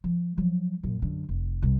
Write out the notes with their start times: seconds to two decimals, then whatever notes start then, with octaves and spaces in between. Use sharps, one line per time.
0.04 F3
0.37 F3 F#3
0.83 F#2 A#2
1.02 F#2 D3
1.29 F1
1.62 C2 C3